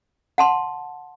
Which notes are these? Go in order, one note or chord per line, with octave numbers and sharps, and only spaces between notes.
F#5 A5 C6